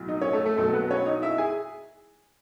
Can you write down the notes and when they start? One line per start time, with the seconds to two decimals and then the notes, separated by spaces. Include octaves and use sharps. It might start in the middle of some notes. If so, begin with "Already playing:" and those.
Already playing: B1 A2 F#3
0.08 D#4 D#5
0.21 C#4 C#5
0.33 A3 A4
0.45 A3 A4
0.57 B1 B2 F#3 A3 A4
0.73 B3 B4
0.90 C#4 C#5
1.06 D#4 D#5
1.22 E4 E5
1.38 G#4 G#5